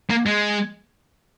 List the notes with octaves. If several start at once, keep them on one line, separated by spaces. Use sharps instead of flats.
A#3
G#3